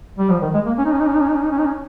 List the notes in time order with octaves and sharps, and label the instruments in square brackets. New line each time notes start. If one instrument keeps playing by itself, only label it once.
[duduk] G3
F3
D#3
G#3
A#3
C#4
D#4
C#4
D#4
C#4
D#4
C#4
D#4
C#4
D#4
C#4
D#4
C#4